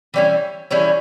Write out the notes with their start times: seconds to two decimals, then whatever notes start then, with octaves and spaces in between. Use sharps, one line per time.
0.14 E3 G3 C#4 E4
0.71 E3 G3 C#4 E4